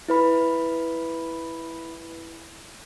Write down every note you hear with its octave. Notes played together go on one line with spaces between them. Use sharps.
E4 B4 B5